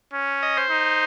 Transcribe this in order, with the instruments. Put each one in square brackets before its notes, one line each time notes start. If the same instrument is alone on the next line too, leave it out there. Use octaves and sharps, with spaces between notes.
[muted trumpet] C#4
[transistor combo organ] D#5
C5
[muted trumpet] D#4